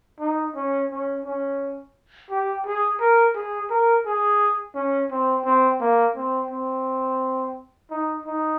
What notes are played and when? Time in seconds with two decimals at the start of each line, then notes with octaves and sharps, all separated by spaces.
0.20 D#4
0.56 C#4
0.91 C#4
1.26 C#4
2.30 G4
2.66 G#4
3.00 A#4
3.36 G#4
3.70 A#4
4.06 G#4
4.75 C#4
5.11 C4
5.45 C4
5.81 A#3
6.16 C4
6.51 C4
7.91 D#4
8.26 D#4